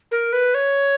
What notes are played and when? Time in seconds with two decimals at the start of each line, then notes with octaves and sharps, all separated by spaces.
0.11 A#4
0.33 B4
0.54 C#5